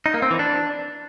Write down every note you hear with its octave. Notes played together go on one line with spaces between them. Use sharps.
D#4
A#3
C4
E3
D4